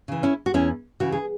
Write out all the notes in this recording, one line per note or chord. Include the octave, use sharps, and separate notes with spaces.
C#3 E3
C#4 E4
F#4
E2 C#4 E4
C#3 E3 F#4
G#4